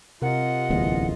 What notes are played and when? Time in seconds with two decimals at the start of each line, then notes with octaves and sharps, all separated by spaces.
0.22 C3 F4 A#4 D#5 F#5
0.70 D1 A1 E2